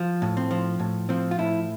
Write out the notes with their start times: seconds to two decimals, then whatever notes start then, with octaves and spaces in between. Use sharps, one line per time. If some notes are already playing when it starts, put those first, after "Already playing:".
Already playing: F3
0.22 A2
0.37 C4
0.51 F3
0.80 A2
1.09 F3 C4
1.31 F4
1.39 A2 E4